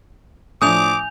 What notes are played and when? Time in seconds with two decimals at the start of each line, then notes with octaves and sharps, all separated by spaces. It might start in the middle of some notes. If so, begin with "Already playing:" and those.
0.62 A2 F3 D4 G#5 D6 D#6 G6 F7